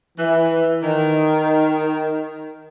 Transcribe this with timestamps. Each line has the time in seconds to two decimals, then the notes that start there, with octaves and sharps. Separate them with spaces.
0.17 E3
0.83 D#3